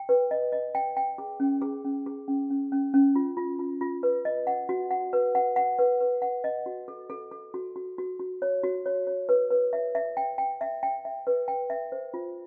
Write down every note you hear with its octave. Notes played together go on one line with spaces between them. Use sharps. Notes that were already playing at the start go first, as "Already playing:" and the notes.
Already playing: G5
B4
D#5
D#5
G5
G5
G#4
C#4
G#4
C#4
G#4
C#4
C#4
C#4
C#4
F4
F4
F4
F4
B4
D#5
F#5
F#4
F#5
B4
F#5
F#5
B4
B4
F#5
D#5
F#4
A4
A4
A4
F#4
F#4
F#4
F#4
C#5
F#4
C#5
C#5
B4
B4
E5
E5
G5
G5
E5
G5
E5
B4
G5
E5
C5
F4